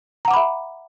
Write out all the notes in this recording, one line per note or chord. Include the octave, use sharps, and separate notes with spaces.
E5 F#5 A#5 B5 D6